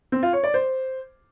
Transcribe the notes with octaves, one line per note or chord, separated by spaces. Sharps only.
C4
F4
C#5
D5
C5